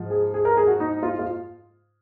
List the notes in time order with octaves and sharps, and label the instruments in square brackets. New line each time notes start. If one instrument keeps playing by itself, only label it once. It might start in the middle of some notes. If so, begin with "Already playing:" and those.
Already playing: [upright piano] G#2 F3
G#4
G#4
A#4
G#4
F#4
D#4
F4
F4